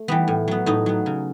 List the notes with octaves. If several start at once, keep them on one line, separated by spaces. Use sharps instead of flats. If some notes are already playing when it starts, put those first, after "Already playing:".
Already playing: A3
E3 G3 B3
A2
F#3 B3
A2 D#4
F#3 B3
C#3